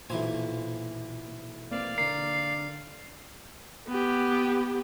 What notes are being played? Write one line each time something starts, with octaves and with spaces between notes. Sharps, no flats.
B1 A#2 E3 F4 C5 G#5
A#3 C4 D5 F5
D3 A#4 C7
B3 G4